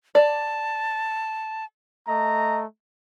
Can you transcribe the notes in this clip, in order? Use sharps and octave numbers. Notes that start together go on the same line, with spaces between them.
D5 A5
A3 D#5 A#5